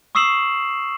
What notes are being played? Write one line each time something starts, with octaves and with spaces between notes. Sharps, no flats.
C#6 D#6 E6 C7 E7 F#7